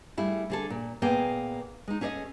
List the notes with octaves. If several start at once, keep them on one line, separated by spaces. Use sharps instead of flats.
G3 A3 E4 G#4
D3 G#4 A4
A#2
A#2 A#3 B3 G#4 G5 G#5
G#3 D#4
C#4 G#4 A4 D5 D#5